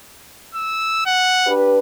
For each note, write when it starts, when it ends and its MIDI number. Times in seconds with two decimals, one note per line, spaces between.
0.55 1.03 88
1.06 1.53 78
1.47 1.79 62
1.47 1.79 67
1.47 1.79 71